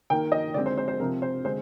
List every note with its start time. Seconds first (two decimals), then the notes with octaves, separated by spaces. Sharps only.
0.10 D#3 A#3 G5
0.32 D#5
0.54 D3 G#3 C4 D5
0.66 C5
0.78 C5
0.88 C5
0.99 C3 F3 C4 A#4
1.22 C5
1.44 D3 G#3 C4 C5